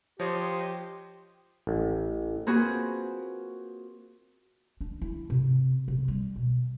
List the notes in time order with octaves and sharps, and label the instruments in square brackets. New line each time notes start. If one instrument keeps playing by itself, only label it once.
[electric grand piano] F3 C#5 [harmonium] G4 [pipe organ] C5 D#5
[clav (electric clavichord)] A1
[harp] A#3 C4 F4 F#4 G#4 B4
[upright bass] D4
E4
C3
C3
G3
B2